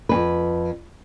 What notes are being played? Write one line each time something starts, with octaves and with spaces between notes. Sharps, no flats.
F2 G#2 B4